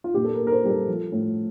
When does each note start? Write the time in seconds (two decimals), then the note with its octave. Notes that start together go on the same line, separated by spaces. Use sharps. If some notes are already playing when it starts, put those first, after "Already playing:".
0.04 F4
0.14 A#2 G4
0.24 A4
0.34 A#4
0.40 A#3
0.47 A#4
0.52 C5
0.64 G3 G4
0.70 A4
0.88 F3
1.12 A2